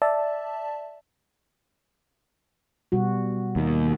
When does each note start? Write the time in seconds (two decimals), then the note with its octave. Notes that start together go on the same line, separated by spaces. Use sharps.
0.02 D5 E5 A5
2.92 B2 G3 F#4
3.56 D#2